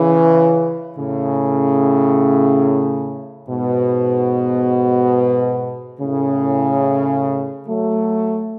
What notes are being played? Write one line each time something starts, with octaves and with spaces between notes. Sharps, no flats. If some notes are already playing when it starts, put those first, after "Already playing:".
Already playing: C#3 E3
A2 C#3
G#2 B2
A2 C#3
F#3 A3